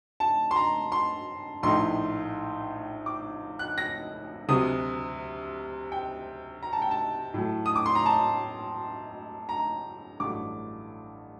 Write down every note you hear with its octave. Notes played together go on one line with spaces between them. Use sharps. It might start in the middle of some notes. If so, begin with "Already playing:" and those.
A5
C6
A#5
C6
A#1 A2 A3 D#4 C6
D6
F#6
A#6
D2 C3 F#3 D#6
G5
A#5
A5
G5
A5
A2 F#3 A3
D#6
D6
C6
A#5
A5
A#5
A1 G2 F#3 A3 D6